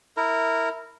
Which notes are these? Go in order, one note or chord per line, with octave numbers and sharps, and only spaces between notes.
E4 A#4